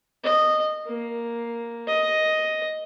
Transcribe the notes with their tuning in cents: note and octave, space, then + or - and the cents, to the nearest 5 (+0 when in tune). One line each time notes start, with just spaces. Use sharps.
D#5 -15
A#3 +0
D#5 +5